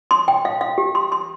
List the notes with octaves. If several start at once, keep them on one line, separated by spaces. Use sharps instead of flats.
C6
G5
F5
F5
G4
C6
C6